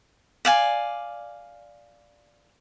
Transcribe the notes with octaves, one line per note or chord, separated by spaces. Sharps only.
D5 F5 G#5